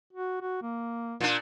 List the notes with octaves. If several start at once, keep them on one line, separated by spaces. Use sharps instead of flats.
F#4
F#4
A#3
A#2 D4